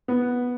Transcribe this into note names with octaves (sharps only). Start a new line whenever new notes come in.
B3